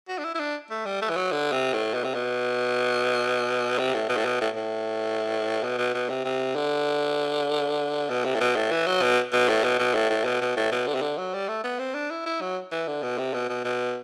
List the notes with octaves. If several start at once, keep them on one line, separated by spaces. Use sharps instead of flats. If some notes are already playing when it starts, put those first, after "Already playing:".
F#4
D4
E4
E4
D4
A3
G3
A3
E3
F#3
D3
C3
A2
B2
C3
B2
C3
A2
B2
A2
B2
A2
A2
B2
B2
B2
C3
C3
D3
B2
C3
A2
B2
A2
E3
F#3
B2
B2
A2
B2
B2
A2
A2
B2
B2
A2
B2
D3
C3
D3
F#3
G3
A3
B3
C4
D4
E4
E4
F#3
E3
D3
B2
C3
B2
B2
B2